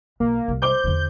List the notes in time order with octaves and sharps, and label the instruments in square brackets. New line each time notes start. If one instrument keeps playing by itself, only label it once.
[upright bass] B1 [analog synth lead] A#3
[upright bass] C2
[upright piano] C5 D6 G7 [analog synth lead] G6
[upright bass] E2 D3